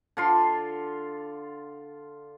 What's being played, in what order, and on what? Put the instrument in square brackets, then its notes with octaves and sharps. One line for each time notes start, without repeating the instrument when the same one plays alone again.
[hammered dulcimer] D3 F4 C6